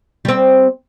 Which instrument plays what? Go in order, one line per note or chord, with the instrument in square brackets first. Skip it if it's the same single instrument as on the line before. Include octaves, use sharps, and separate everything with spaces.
[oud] G3 C4